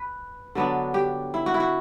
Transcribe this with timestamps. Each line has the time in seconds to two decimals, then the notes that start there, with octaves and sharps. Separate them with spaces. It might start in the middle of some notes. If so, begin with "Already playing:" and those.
Already playing: B4
0.55 D3 F#3 B3 D4
0.94 G4
1.34 E4
1.46 F#4
1.54 E4
1.60 F#4